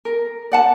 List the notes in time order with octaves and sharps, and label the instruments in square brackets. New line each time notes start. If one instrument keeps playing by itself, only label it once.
[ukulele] A#4
D5 F#5 A5